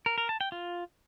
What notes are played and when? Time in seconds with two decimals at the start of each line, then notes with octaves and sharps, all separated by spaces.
0.06 A#4
0.18 A#4
0.29 A5
0.41 G5
0.52 F4